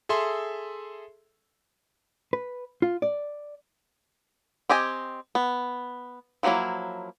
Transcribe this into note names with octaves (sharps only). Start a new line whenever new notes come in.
G#4 A4 E5 C6
B4
F4
D5
C4 G4 D#5 G#5
B3
F3 F#3 A3 A#3 E4